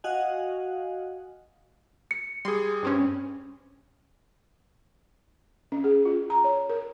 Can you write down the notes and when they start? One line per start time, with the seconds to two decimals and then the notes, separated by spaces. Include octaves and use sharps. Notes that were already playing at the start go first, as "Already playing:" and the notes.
0.04 F#4 D#5 F5 F#5 G#5
2.11 C#7
2.45 G3 G#4 C6
2.83 G2 C4 C#4
5.72 C#4
5.84 G#4
6.05 F4
6.30 A#5
6.44 C#5
6.70 A#4